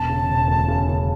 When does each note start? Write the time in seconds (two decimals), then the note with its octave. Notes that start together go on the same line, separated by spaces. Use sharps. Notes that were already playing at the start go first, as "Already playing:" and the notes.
Already playing: E1 A5
0.09 C#3
0.28 E1
0.48 D2
0.68 C#3
0.89 C#3